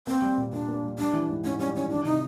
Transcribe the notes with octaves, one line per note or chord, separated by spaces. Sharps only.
A#3 C4
G3
A#2
A#2 D4
A#3
G3
G3 D4
E3
G#2
G#2 C#4
G3 C#4
E3 C#4
D#3 D4
C3 D#4